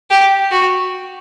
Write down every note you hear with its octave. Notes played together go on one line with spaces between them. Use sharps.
G4
F#4